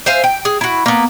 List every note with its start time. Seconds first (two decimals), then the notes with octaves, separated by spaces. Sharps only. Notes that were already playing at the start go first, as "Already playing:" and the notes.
0.06 C5 E5 F5 G#5
0.24 G5
0.45 G#4
0.61 E4 F#4
0.86 A#3 B3